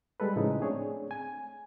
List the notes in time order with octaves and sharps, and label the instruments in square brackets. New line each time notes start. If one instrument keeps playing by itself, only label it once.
[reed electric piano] G3 G#3 A4 B4
A2 C#3 F3 G#3 D#4
A3 C4 D4 G#4 C#5
G#5